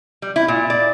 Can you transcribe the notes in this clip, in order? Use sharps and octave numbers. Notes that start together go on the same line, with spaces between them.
G3
E4
A#2
D5